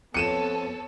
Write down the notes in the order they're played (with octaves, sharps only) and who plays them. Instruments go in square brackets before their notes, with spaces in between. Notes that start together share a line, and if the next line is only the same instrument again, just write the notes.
[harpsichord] F2 [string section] B3 A4 C#5 [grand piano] C#7 D#7 E7